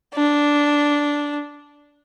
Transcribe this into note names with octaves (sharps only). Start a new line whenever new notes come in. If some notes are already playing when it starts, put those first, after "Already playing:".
D4